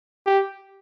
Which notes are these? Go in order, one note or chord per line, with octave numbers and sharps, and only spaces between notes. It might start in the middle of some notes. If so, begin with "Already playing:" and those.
G4